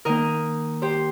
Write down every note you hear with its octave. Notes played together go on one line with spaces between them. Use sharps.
D#3 A#3 A#4 D#5
G4 C5